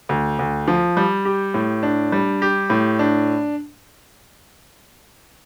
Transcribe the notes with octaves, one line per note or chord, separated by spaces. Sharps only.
D2
D2
F3
G3
G4
A2
D4
G3
G4
A2
D4